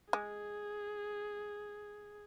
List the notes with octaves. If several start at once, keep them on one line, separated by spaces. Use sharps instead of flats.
G#3 G#4